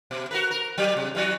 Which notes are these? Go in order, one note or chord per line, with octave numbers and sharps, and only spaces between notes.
B2
F#4 A#4 B4
A#4
F#3 G4
C3
E3 F#3 F#4